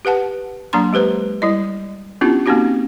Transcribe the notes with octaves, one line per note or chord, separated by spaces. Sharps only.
G4 B4 F#5 A5
F#3 A#3 D4 A#5 C6
G#3 G4 B4 C5
G3 E4 D#5
B3 C#4 D4 E4 F4 G4
A#3 C4 C#4 D#4 F#4 G4